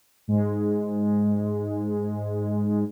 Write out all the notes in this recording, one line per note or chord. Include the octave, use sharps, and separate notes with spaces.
G#2 G#3